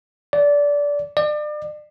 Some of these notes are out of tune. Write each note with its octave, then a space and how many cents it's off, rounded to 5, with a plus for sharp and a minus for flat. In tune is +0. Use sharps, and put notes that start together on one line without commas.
D5 -20
D5 +35